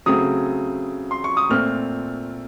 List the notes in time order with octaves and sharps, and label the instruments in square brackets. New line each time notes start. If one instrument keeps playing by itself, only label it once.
[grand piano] C#3 F#3 A3 C4 D#6
C6
C#6
D#6
A#2 A3 C4 F6